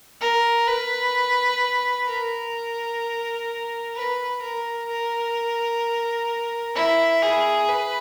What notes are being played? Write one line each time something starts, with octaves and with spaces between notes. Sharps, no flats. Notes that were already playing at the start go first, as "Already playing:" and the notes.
A#4
B4
A#4
B4
A#4
A#4
E4
G#4
B4